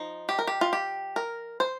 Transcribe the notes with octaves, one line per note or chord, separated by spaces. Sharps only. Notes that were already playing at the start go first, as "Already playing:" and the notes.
Already playing: F3 D#4
G4
A#4
G4
F4
G4
A#4
C5